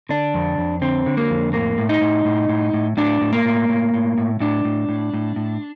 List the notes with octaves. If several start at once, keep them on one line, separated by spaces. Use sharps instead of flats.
D3 D4
F2
F2
D3 C4
D3
A#3
F2
A2 A#3
A2
D#4
A2
A2
A2
A2
A2 D4
A2
A#3
A2
A2
A2
A2
A2 D4
A2
A2
A2
A2